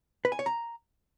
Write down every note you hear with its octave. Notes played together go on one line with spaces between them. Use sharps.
B4
G#5
C#5
A#5